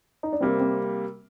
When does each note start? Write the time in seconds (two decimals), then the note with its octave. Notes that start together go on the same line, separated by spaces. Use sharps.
0.23 D#4
0.33 D4
0.41 C3 G3 A#3 C4
0.60 C4